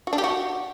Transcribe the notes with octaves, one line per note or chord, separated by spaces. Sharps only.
F#4
D4
G4
F#4